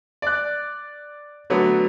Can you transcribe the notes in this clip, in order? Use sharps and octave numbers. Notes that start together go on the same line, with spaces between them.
D5 F#6
D3 F#3 A3 B3